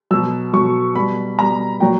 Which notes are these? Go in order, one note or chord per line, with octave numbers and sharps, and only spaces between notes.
B2 F#3 E6
B2 F#3 C#6
B2 G3 B5
B2 G3 A#5
A#2 F#3 G5